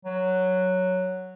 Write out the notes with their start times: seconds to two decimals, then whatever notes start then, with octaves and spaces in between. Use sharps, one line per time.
0.05 F#3